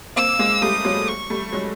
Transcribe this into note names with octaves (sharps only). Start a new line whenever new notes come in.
A#3 C4 E6
G#3 A#3
G3 A3 D#6
F#3 G#3
C#6
G3 A3
F#3 G#3